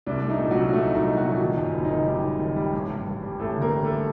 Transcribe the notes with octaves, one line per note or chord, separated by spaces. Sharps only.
C2 D4
A3
D#4
A#2
F#3 F#4
C2
A3 D#4
C2 D#4
C2
F#3 F#4
A#2
D#3 D#4
F#2
F#1
D#3 D#4
D#3 G3 G4
D#3
D#3
G3
A1
G2
G2
G3
A1 A3 A4
D3
A#3 A#4
G3
A3 A4